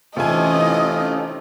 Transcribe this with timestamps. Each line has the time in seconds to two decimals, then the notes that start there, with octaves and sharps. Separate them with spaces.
0.17 C3 E3 A3 C#4 D#4 F4 D#5 G#5